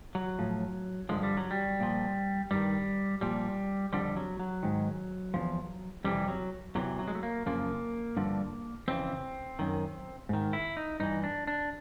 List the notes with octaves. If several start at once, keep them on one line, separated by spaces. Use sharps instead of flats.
F#3
A2 F3
G2 D3 F3 G#3
G3
F#3
G3
A#2 F3
G2 D#3 G3
A#2 F3 G3
F2 D3 F3 G3
F#3
F#3
G#2 D#3
E2 C3 F3
F2 C3 E3 G3
F#3
E2 C3 E3 F#3
F#3
G#3
A3
A#3
F#2 C#3 F3 A#3
G2 D3 F3
F2 C#3 E3 C4
F#2 D#3
G#2 D#3
E4
D#4
G2 E3 D#4
D4
D4